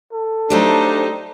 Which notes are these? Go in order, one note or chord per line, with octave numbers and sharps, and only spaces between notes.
A4
F#3 A3 D4 D#4 G4 C5